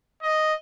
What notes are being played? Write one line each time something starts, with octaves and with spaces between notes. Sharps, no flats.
D#5